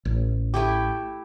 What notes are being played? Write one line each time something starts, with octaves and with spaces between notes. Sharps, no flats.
A1
A3 E4 G4